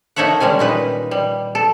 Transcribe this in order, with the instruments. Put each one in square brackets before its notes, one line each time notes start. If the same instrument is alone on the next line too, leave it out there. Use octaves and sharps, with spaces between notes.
[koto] A#3 D#4 A4 C#5 E5 F#5
D#3 G3 G#3 C#4 G#5
A#2 D#4 B4
G3
A4